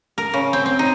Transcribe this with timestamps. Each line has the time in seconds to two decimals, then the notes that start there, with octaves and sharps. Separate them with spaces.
0.18 A#4
0.34 C#3
0.53 C4
0.66 C4
0.79 D#4